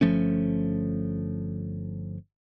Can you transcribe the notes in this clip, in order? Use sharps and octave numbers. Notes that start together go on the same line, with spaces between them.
G1 F3 A3 C#4